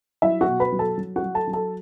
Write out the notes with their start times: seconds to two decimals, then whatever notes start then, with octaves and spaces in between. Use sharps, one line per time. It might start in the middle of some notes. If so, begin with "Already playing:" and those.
0.22 F#3 E4 E5
0.41 F#4 F#5
0.47 B2
0.60 B4 B5
0.72 F#3
0.79 A4 A5
0.98 F#3
1.16 F#4 F#5
1.23 F#3
1.34 A4 A5
1.47 F#3
1.53 A4 A5